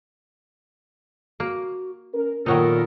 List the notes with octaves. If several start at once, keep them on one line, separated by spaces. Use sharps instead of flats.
A#3 F#4
C#4 A#4
A#2 D#3 F#3 B3 D#4 F4 A4 A#4